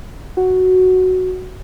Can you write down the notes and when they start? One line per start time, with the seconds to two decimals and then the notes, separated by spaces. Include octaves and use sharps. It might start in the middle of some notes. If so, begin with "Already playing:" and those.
0.37 F#4